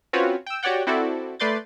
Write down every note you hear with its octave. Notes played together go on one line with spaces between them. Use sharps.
C4 C#4 F4 F#4 B4 C#5
G5 E6
F#4 G4 C#5 D5 F#5 G5
C4 E4 F#4 A4 D5
A3 B4 D5 C6 G6 A6